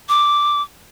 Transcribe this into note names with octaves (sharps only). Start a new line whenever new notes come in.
D6